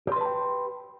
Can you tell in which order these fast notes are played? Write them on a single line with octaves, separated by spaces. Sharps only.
G4 C6 B4 A5 G5